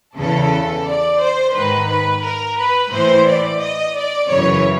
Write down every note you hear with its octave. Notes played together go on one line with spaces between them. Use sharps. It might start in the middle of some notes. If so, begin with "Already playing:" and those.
E2 C#3 E3 A4
D5
C5
G#2 D#3 B4
B4
A#4
B4
A2 E3 C5
D5
D#5
D5
F#2 C#3 E3 C#5